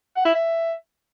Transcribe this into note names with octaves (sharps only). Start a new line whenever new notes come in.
F#5
E4
E5